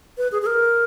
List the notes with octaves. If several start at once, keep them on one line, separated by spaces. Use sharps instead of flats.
B4
G#4
G#4
A#4